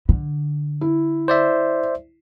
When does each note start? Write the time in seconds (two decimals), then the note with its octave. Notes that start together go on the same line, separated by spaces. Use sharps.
0.09 D3
0.81 E4
1.28 C5 D5 E5